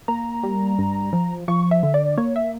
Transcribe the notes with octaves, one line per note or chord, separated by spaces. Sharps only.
A#3 A#5
G3
G2
F3
F3 C#6
E5
D3
D5
A#3 C#5
E5